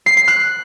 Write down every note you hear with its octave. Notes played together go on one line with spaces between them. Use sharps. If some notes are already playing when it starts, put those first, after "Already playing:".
C7
C7
F#6